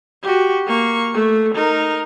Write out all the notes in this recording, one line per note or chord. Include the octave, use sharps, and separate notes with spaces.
F#4 G4
A#3 C#6
A3
D#4 A#4